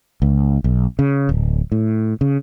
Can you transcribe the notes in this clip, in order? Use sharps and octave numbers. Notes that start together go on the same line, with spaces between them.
C#2
B1
C#3
D1
A2
C#3